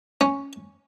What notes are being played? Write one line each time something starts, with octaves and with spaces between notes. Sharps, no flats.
C#4